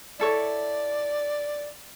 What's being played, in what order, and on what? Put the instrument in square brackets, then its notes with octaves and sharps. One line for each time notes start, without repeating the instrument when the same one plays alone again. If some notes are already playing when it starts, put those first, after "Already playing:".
[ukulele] E4 A4 C#5 [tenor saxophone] D5